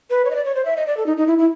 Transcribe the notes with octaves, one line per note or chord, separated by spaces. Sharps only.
B4
C#5
D#5
D5
C#5
C5
E5
D#5
D5
A4
D#4
D#4
E4
E4